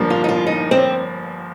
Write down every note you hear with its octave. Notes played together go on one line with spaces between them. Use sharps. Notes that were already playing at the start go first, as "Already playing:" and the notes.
Already playing: G1 G2 F3 A#3 D4
F4
D#4
F4
D#4
C4